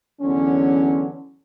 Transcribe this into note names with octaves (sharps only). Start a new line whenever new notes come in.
E2 D3 F#3 C#4